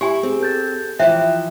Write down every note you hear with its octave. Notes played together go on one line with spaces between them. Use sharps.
E4 G4 G#5
C4 G#4
A4 G6 A6
E3 F3 E5 G5 F#6